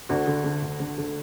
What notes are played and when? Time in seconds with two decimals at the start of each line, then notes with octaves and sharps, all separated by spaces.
0.09 D2 D4 F#4
0.27 D3
0.44 D3
0.62 D2
0.80 D3
0.98 D3